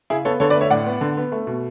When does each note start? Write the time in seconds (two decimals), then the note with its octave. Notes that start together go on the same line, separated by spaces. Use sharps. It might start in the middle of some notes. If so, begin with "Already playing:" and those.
0.10 C#3 E4 G#4
0.25 B3 A4 C#5
0.40 D3 A4 C#5
0.50 B4 D5
0.55 A3
0.61 C#5 E5
0.70 A2 D5 F#5
0.86 B3
1.01 D3
1.17 B3
1.32 A3
1.47 B2